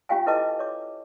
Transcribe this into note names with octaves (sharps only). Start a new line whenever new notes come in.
C#4 F4 G4 F5 G5 G#5
E4 A4 B4 D#5 A5 D6
C#5 D6